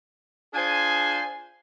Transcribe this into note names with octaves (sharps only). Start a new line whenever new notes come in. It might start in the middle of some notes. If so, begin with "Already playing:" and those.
D4 F4 G#4 C5 G#5